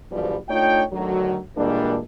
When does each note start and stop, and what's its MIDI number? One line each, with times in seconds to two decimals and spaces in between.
0.11 0.36 31
0.11 0.36 40
0.11 0.36 44
0.11 0.36 47
0.11 0.36 53
0.11 0.36 55
0.49 0.84 57
0.49 0.84 62
0.49 0.84 63
0.49 0.84 65
0.49 0.84 73
0.49 0.84 79
0.92 1.38 38
0.92 1.38 50
0.92 1.38 51
0.92 1.38 54
1.57 1.99 46
1.57 1.99 52
1.57 1.99 55
1.57 1.99 56
1.57 1.99 58
1.57 1.99 62